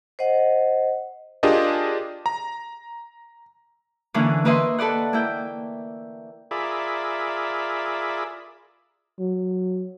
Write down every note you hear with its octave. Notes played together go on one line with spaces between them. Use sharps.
C5 D#5 F#5
D4 F4 G4 G#4 A#4 D#5
A#5
D3 E3 A#3 C#4 D4
A#3 B4 D#5 E5 B5 C6
A4 B4 D5 F#5
A#3 E4 G5
F4 G#4 A#4 D5 E5 B5
F#3